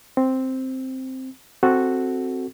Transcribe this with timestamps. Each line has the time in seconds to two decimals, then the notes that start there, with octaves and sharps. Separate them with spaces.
0.17 C4
1.63 C4 F#4 A4